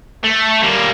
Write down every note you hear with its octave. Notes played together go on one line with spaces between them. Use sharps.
A3
G3 A#3